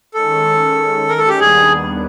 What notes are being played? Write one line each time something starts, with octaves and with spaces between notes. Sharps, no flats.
D#3 G#3 C#4 A4
A#4
A4
G4
D#2 D#3 G3 B3 D4 G#4